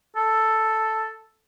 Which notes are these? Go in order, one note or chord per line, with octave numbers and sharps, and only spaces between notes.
A4